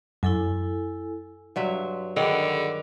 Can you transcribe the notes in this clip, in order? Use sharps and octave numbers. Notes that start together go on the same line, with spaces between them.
F#2 E4 A4 G#5
G2 F#3 E5 C6
D3 D#3 G#4 F#5 B5